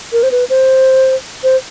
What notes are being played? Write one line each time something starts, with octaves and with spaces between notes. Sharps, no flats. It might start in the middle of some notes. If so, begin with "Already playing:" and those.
A#4
C5
B4
C5
C5